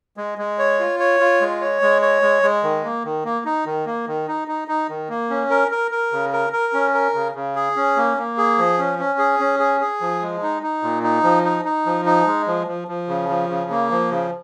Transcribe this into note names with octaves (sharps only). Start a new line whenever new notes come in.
G#3
G#3
C#5
F4
C#5
F4
G#3
C#5
G#3
C#5
G#3
G#3
D#3
A#3
D#3
A#3
D#4
D#3
A#3
D#3
D#4
D#4
D#4
D#3
A#3
C#4
A#4
A#4
A#4
C#3
A#4
A#4
C#4
A#4
C#3
C#3
G#4
C#4
A#3
A#3
G#4
F3
C#4
C#4
G#4
C#4
G#4
G#4
F3
G#3
D#4
D#4
A#2
D#4
F3
D#4
D#4
F3
D#4
G#3
F3
F3
F3
C#3
F3
C#3
A#3
F3
C#3